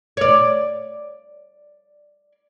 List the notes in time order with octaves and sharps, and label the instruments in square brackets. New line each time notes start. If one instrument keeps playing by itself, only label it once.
[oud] C#5 D5